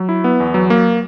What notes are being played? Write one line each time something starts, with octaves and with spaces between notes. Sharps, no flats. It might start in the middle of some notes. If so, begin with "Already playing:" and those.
Already playing: F#3
E4
B3
E2
F#3
A#3